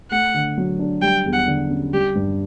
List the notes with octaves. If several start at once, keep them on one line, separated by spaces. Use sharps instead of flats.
A3 F#5
D3
F#3
D4
G3 G5
E2
F#5
D3
C#4
G3 G4
G2